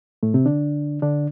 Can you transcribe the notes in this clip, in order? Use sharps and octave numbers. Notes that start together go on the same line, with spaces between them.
A2 A3
C3 C4
D3 D4
D3 D4